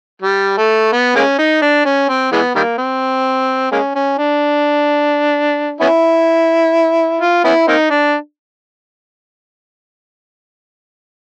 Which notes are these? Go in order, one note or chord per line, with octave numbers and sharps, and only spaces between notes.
G3
A3
B3
G#3 A#3 C#4
D#4
D4
C#4
C4
E3 G#3 B3
D#3 G3 A#3
C4
G#3 A#3 C#4
C#4
D4
B3 C#4 E4
F4
B3 C#4 E4
A#3 C4 D#4
D4